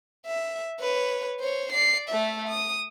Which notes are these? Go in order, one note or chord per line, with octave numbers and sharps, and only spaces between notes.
E5
B4 C#5
C5 C#5
D5 C7
A3 E5
D#6